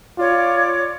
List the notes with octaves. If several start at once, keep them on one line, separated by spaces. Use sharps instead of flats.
F4 C#5 D5 D6